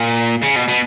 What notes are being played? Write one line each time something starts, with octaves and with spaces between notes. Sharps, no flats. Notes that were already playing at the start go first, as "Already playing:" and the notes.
Already playing: A#2
C#3
B2
B2